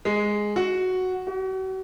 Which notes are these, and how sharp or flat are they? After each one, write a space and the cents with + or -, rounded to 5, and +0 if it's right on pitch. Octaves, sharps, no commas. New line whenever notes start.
G#3 +0
F#4 +0
F#4 +40